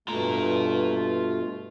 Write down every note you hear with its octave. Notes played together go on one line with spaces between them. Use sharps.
G2 B2 A3 F4 A#5